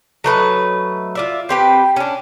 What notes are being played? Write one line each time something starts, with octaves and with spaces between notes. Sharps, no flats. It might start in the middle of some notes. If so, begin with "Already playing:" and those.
F#3 A3 B4 D#5
F4 D5 E5
C4 G4 B4
C#4 D4